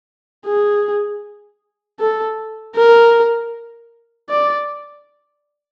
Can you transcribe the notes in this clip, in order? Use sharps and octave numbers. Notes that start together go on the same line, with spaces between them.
G#4
A4
A#4
D5